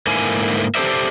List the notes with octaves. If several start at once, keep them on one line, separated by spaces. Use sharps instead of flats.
G#2 D3 A#3 E4 G#5
G4 A4 A#4 C5 D5 E5